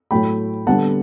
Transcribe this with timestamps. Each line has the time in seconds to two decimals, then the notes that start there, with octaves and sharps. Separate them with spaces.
0.11 A2 F#3 A3 G5 B5
0.67 D3 G3 B3 F#5 A5